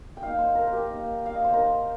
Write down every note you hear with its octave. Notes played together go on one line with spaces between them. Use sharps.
G5
A#3 D#4 F5
C5
A#4
A#4
G4
A#3 D#4
F5
D#5
C5
A#3 D#4 A#4